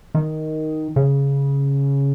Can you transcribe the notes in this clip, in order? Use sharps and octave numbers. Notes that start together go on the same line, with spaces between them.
D#3
C#3